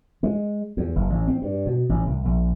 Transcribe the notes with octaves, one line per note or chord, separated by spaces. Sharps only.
G#3
E2
F#1
A1
C4
G2
B2
A1
C2
A#1